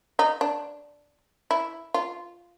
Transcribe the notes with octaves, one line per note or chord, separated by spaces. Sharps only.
D#4
D4
E4
F4